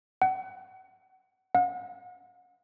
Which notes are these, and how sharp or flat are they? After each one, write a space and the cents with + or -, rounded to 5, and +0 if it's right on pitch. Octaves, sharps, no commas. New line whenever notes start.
F#5 +30
F#5 -40